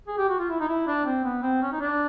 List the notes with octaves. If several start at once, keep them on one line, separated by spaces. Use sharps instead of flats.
G#4
G4
F#4
F4
E4
D#4
E4
D4
C4
B3
C4
C#4
D#4
D4